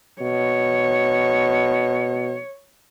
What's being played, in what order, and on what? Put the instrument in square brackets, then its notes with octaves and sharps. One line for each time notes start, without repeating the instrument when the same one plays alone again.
[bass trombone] B2 [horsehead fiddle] C#5